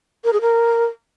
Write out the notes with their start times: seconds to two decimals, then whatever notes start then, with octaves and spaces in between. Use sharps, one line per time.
0.24 A#4
0.33 G#4
0.41 A#4